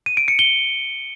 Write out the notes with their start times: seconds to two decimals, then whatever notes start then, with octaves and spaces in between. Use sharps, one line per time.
0.06 D#7
0.17 D7
0.28 C#7
0.39 G7